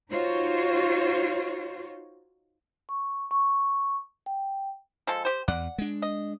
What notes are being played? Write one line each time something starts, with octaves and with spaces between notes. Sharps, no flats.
D#4 F4 F#4 C5 C#5
C#6
C#6
G5
F3 G#3 A4
G4 C5
E2 D5 F#5
G#3 D4
D#5